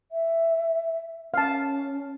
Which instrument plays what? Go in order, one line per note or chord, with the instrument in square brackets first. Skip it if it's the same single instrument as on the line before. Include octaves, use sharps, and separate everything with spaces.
[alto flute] E5
[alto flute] C#4 [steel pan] F5 A5